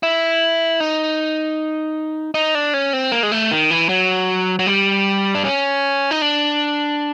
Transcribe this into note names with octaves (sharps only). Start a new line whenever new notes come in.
E4
D#4
D#4
D4
C#4
C4
A#3
G#3
A3
D#3
E3
F#3
F#3
G3
D4
C#4
D#4
D4